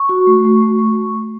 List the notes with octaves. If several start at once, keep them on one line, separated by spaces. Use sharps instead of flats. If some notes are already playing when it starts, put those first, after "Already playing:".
Already playing: C#6
F#4
A3
A3
A3
A3